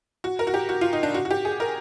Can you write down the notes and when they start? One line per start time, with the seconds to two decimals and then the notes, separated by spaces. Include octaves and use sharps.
0.24 F#4
0.39 A#4
0.47 F#4
0.54 G4
0.69 F#4
0.81 F4
0.93 D#4
1.03 D4
1.14 F#4
1.25 F#4
1.30 G4
1.45 G#4
1.60 A#4